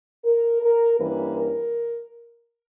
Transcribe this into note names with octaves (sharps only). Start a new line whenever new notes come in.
A#4
A#4
G2 E3 A#3 C#4 B4
A#4